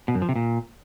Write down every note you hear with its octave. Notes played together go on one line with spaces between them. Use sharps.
B2
F#2
F3
C3
A#2